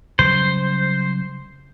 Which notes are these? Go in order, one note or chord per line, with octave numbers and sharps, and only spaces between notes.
C#3 F#3 G3 C5